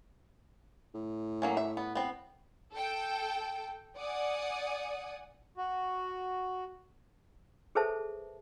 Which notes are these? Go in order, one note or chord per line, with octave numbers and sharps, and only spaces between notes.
A2
F#3 A#3 C#4
E5
B3
B3 C4
A4 G5
D5 F#5 G#5 D#6
F#4
G#4 A4 B4 C5 E5 A5